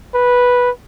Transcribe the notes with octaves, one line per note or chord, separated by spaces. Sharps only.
B4